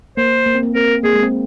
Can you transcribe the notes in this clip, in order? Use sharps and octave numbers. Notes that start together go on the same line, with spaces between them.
A#3 C5
A#3
C4
A#3
C4 A#4
A#3 G#4
G#3
C4